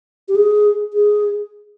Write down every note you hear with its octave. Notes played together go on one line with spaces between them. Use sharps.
G4
G#4
G#4